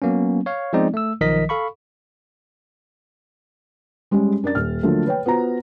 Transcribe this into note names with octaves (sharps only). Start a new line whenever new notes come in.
F#3 A#3 B3 C#4
C#5 F5
F3 G#3 B3 C4 D#4 D5
A3 E6
B1 D#3 F3 A#4 D#5 B6
A4 F5 B5 C#6
G3 G#3 C#4 G4 G#4
F#2 D4 A#4 D5 A6
D#1 F6
D3 F3 F#3 A3 A#3
B4 C#5 G5
B3 F4 F#4 C5 A#5